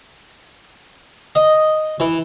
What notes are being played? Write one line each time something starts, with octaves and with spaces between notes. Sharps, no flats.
D#5
E3